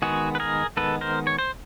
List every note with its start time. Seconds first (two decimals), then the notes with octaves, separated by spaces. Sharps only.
0.02 D#3 G#3 B3 F#4 G#4
0.35 B4
0.40 G#4 A#4
0.77 D#3 G#3 B3 A4 B4
1.01 A#4 C5
1.27 C#5
1.39 C5